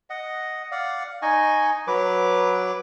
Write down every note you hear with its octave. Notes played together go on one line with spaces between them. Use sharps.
D#5 F#5
D5 F5 F#5
D#4 D#5 G#5 C#6
F#3 B4 D6